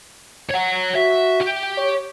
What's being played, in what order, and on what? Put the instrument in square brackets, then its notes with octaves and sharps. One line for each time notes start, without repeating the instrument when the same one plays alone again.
[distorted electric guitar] C#5 F#5
[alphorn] F#4 [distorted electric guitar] E5
[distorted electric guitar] G4
[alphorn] C#5